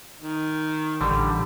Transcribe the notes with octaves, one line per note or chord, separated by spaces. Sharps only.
D#3
A1 D3 G3